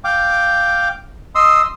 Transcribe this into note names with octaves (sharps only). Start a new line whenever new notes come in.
F5 G5 D6
D#5 C6 D#6 E6